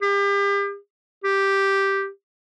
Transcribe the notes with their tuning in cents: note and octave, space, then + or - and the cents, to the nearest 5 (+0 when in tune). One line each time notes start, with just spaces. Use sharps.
G4 +35
G4 +0